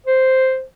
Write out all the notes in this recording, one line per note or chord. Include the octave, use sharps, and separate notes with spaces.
C5